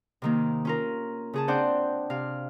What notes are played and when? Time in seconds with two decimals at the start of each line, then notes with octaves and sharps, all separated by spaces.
0.22 C3 D#3 A#3
0.65 C#4 F4 A#4
1.33 C#3 G#4 A5
1.48 C4 D4 C5 D5 F#5 G5
2.10 C3 F5